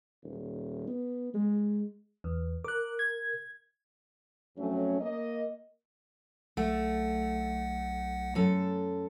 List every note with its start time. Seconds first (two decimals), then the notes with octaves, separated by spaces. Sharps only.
0.23 D#1
0.88 B3
1.34 G#3
2.24 E2
2.64 A#4 D6 F#6
2.99 G#6
4.58 F2 F#3 A3 C#4
5.01 A#3 D#5
6.57 B1 A3 F#5
8.35 F#2 A4